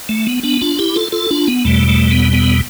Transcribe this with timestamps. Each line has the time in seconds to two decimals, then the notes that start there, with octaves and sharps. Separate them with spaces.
0.09 A3
0.27 B3
0.43 B3 D4
0.61 D4 F4
0.79 E4 G4
0.96 F4 A4
1.12 F4 A4
1.31 D4 F4
1.47 B3
1.65 E2 B2 G3 A3
1.88 A3
2.11 B3
2.33 B3